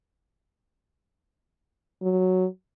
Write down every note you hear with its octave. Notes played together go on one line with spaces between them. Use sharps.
F#3